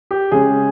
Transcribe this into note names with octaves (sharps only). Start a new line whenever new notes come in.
G4
C#3 G#3 C#4 G#4